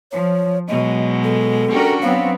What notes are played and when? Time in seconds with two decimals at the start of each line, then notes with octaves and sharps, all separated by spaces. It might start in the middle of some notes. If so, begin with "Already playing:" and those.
0.12 F3 C#5
0.68 B2 F#3 G#3 D#5
1.24 A4
1.70 C#4 D4 F#4 G4 A#4
2.02 F#3 B3 C4 F5